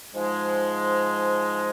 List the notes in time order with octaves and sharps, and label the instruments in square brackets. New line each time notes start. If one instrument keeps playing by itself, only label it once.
[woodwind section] G#2 F3 G#3